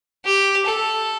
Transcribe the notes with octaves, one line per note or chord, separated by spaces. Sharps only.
G4
A4